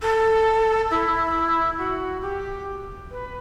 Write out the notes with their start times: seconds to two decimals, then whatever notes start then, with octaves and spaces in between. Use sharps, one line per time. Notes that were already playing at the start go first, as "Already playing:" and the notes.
0.02 A4
0.91 E4
1.78 F#4
2.22 G4
3.11 B4